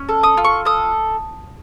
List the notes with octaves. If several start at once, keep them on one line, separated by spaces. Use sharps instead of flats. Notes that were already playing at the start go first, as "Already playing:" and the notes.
Already playing: C#4
A4
D#6
F4
C#6
A4 D#6